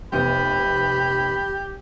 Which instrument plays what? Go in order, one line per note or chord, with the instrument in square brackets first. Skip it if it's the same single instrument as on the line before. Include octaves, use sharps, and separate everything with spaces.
[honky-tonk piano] F1 B3 [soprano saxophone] G4 [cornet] B5